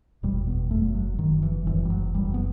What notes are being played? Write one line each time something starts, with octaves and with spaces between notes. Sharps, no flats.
F#1 E2 B2 G3
B3
F#1 F#2 A3
F#3
F#1 F#2 D#3
E3
F#1 F#2 E3
G3
F#3
F#1 F#2 G3
B3